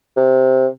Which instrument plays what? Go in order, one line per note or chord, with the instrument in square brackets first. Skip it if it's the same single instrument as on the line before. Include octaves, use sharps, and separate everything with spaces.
[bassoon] C3